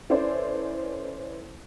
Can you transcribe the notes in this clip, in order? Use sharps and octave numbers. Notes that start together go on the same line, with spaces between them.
C#4 E4 A4 B4 C5 D5